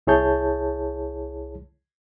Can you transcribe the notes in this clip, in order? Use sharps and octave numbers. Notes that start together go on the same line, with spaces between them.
C2 E4 G#4 C#5 A5 G6